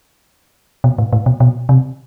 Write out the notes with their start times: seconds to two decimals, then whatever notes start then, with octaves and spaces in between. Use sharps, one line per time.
0.84 B2
0.98 A2
1.13 A2
1.26 B2
1.40 B2
1.69 C3